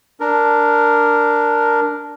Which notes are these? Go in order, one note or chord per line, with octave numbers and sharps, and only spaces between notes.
D4 A#4